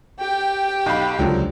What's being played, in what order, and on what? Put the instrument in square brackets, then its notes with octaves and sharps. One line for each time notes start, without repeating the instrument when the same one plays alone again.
[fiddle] G4 G5
[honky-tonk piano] B1 F5 B5
[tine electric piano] C#2 [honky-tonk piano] D3 F3 F#3